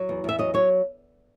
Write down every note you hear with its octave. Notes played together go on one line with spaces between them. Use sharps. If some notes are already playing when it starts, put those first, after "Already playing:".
Already playing: F#3
E2
E2 E5
F#3 D#5
F#3 C#5